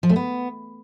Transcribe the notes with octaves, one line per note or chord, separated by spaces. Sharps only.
F3
A3
B3